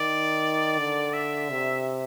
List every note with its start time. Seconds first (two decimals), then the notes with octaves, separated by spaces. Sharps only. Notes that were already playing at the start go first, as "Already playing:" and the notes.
Already playing: D#3 D5
0.79 D3
1.13 E5
1.49 C3